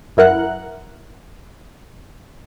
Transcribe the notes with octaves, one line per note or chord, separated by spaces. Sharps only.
F#2 E4 A#4 F#5 F#6